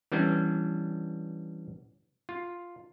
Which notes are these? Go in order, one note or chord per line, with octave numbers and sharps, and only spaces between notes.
E3 G3 B3 C#4 D4
F4